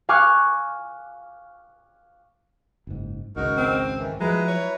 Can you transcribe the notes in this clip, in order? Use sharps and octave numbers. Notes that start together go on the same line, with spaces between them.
F5 G#5 C#6 D6 F6 F#6
F#1 G#2
G#1 C#2 C#3 D#4 F#4 A#4
C4
D#3 E3
F3 F#3 G#3 E4 B4 A#5
C#5